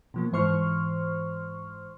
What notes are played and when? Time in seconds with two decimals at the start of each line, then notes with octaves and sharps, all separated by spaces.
0.14 B2 F3 A#3
0.33 G#2 E3 C5 C6 C#6 F6